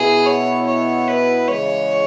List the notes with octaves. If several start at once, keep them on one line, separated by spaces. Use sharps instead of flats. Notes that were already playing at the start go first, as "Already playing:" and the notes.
Already playing: B2 B3 E4 G#4
C#5
C#5
B4
C#3 E3 G#3 C#5